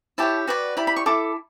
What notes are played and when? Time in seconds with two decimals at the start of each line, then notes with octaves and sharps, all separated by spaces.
0.18 E4 G4 C#5 A5
0.47 F#4 B4 D5
0.77 E4 G4 D5 B5
0.87 B5
0.96 C#6
1.06 E4 A4 D6